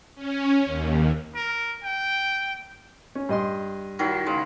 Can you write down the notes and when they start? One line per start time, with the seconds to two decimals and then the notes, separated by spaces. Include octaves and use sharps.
0.15 C#4
0.65 D#2
1.35 A#4
1.84 G5
3.15 C#4
3.29 G2 D#5 C6
3.99 D#3 F#3 E4
4.26 C#3 G#3